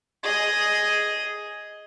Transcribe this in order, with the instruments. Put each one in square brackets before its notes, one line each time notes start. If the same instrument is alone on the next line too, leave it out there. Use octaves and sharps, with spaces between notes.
[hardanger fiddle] G#4 D#5